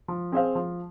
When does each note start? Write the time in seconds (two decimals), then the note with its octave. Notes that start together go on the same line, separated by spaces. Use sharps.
0.08 F3
0.32 C4 G#4 C5 F5
0.55 F3